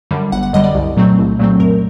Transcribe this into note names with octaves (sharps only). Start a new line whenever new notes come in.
F#2 D3 G3
G1 F#5
F#5
F#2 D3 G3 D#5
D5
C2
A#2 F#3 A3 C4
C2
A#2 F#3 A3 C4
F#2 A#4